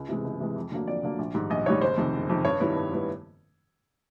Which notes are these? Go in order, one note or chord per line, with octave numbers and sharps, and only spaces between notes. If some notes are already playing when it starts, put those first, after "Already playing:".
Already playing: C#2
C3 E3 G#3
C#2
C3 E3 G#3
F2
D3 F#3 A#3
F2 D5
D3 F#3 A#3
A#1
G#2 D#3 G3
A#1 D#5
G#2 D#3 G3 C#5
F#1 C5
F2 C3 D#3
F#1
F2 C3 D#3
G2 C#5
D#3 G3 B3 E4
G2
D#3 G3 B3 E4